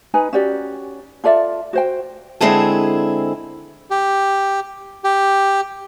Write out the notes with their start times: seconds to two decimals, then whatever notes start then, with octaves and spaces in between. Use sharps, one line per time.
0.14 D#4 B4 G#5
0.33 C#4 F#4 G4 D5
1.24 F4 A4 D5 E5
1.73 F#4 C5 G5
2.41 D3 G#3 C4 E4 G#4 A4
3.91 G4
5.04 G4